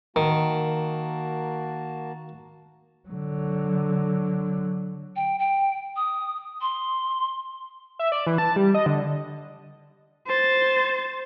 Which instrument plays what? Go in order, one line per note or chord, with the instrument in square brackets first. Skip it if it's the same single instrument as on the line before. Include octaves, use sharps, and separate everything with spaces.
[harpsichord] D#3 [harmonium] A#3 F#4 A5
[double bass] D3 F#3
[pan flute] G5
G5
D#6
C6
[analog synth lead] E5
D5
E3
A5
G3
D#5
D3
[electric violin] C5 A6